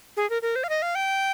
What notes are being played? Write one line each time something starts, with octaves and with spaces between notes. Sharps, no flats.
G#4
A#4
A#4
C5
F5
D#5
F5
G5